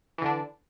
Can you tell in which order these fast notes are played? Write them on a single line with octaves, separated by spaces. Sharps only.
E3 D3 D4